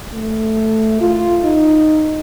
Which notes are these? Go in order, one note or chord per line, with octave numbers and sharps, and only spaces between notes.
A3
F4
D#4